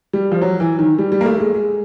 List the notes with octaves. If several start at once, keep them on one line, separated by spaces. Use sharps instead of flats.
G3
F3
F#3
E3
D#3
G3
G3
A#3
A3
G#3
G#3